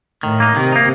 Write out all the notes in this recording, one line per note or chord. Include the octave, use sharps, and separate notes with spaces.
A2 D#3
A#3 D#4
C3 D#3
A#3 D#4